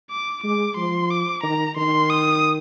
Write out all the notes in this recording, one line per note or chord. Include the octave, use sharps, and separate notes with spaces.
D6
G#3 D6
F3 C6
D6
D#3 A#5
D#3 C6
D#6